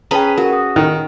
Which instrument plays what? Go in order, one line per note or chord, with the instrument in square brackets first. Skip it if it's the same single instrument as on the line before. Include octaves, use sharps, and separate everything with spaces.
[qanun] C#4 G#4 B4 [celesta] G5 A5 A#5
[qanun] F#4 [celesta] A#4
[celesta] D#6
[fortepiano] D#3